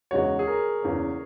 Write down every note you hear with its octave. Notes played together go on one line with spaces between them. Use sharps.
E2 C#3 G#3 D#4 F#4 C#5
G#4
A#4
E2 C#3 E3 A#3 C#4